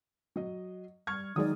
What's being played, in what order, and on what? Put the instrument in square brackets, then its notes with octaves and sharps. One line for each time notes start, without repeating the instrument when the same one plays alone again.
[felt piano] F#3 D#5
[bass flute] G3 [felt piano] C#6 F6 G#6
[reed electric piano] D#3 F#3 G#3 [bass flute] D#4 [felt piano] D5 D#6